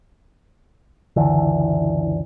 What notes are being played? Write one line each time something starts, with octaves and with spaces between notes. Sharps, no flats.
F#1 C#2 D3 E3